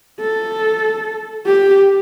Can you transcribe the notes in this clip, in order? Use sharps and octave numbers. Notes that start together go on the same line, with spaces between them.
A4
G4